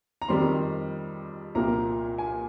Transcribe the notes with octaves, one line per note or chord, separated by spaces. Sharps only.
A#5
F2 D#3 G3 C4 C6
C2 A#2 F3 A#3 A#5
G#5